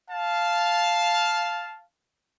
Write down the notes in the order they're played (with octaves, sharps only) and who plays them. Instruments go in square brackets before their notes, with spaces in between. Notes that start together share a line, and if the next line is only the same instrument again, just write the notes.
[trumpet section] F5 A5